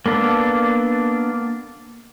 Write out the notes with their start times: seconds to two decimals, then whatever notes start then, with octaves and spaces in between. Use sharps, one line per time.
0.06 A#3 B3 D4 A4